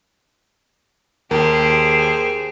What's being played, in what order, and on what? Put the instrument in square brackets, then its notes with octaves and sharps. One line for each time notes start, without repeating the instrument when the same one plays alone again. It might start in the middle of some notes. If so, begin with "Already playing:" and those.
[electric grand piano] D#2 [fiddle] G4 [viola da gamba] G#4 C5 [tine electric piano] A#4